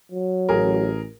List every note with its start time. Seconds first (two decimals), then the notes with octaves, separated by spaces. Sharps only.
0.12 F#3
0.49 A1 G#4 A#4